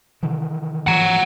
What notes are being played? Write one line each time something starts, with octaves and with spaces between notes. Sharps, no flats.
C3 D#3 E3
G#2 E3 F3 F#5 A#5